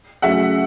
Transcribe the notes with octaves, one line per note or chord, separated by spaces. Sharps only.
C#3 F#3 A3 E5 F#5